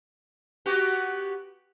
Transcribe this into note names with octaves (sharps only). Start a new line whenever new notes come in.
B3 F#4 G4